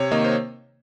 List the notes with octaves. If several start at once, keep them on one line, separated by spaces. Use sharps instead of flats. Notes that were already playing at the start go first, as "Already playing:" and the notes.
Already playing: C3 C#5
D#3 A#3 D#5
C5